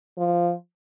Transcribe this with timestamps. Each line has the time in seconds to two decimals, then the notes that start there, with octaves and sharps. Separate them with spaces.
0.18 F3